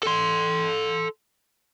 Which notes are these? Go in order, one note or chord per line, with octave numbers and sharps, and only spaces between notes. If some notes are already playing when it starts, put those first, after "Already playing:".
A4 C6